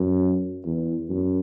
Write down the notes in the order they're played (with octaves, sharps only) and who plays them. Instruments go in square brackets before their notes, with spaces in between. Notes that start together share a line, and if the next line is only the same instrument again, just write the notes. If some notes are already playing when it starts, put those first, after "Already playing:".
Already playing: [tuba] F#2
E2
F#2